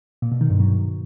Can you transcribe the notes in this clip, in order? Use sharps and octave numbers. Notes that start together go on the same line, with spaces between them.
A#2
B2
D#3
G2
F#3